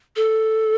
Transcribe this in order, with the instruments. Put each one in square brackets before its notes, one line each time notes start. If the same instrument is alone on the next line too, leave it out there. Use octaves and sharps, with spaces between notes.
[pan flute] A4